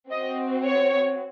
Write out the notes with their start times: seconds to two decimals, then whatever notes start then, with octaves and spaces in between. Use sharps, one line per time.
0.10 C4 F#4 D#5
0.63 C#5